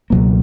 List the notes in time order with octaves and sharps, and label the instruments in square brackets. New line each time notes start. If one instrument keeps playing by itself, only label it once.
[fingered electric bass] C#2 B2 F#3 A#3